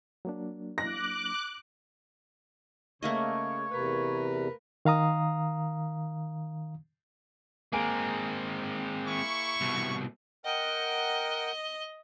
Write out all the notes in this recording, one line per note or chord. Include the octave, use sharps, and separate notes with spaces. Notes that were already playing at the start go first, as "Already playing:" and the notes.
F#3 A#3 D4
D6 F#6 A#6
C#3 A3 A#3 C#5 D#5
E2 C3 A#4 B4
D#3 F5 A#5 D#6
G#3 A#3 C4 G#4 D7
E4 C#6
C2 B2
A#4 D#5 F#5 G5